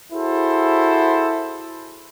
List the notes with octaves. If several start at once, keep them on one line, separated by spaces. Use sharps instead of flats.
E4 F#4 G#4 A4 C5